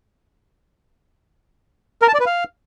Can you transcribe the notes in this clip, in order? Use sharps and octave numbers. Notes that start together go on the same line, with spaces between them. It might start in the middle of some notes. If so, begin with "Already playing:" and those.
A#4
A5
D5
B4
F5